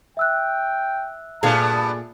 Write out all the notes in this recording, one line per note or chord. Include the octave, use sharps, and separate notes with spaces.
E5 G5 E6 F#6
G2 A#2 B3 G#4 F5 A5